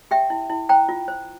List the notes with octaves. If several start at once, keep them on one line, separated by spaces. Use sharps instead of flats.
G4 E5 G5
E4
E4
C5 G5 A#5
F4
C5